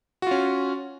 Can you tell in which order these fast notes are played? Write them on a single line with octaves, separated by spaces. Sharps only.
F#4 F4 C#4